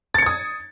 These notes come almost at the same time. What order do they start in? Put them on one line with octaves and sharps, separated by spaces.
A6 C#7 G#6 D#6